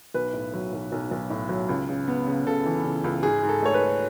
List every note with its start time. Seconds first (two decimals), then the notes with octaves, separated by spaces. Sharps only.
0.14 B1 B4
0.33 A2
0.54 F#3
0.73 B1
0.92 B1
1.11 B1
1.30 A2
1.49 F#3
1.69 C#2
1.89 C#3
2.08 B3
2.27 C#3
2.46 C#3 A4
2.66 E3
2.84 C#3
3.04 C#2
3.23 G#2 G#4
3.43 G#2
3.49 A4
3.63 A3 C#5
3.74 B4
3.81 A3